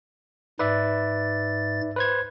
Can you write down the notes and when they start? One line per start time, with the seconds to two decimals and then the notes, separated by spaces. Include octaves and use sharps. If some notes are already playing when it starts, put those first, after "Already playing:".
0.59 G#2 B4 D5 E5 A6
1.96 B4 C5 G#6